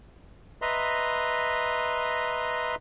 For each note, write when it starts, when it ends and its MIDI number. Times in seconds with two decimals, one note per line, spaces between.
0.62 2.75 71
0.62 2.75 75
0.62 2.75 76
0.62 2.75 82
0.62 2.75 84